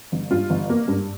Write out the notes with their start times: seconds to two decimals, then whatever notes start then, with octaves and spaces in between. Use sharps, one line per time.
0.12 G1
0.31 G2 F4
0.50 G1
0.70 A#3
0.88 G2